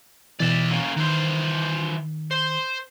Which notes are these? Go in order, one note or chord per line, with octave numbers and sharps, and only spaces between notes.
B2 E3 D5 E5
A#3 C#4
D#3 E3 C5
C5